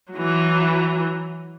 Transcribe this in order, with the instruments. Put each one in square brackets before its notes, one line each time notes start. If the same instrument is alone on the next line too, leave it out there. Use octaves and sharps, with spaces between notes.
[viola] E3 F#3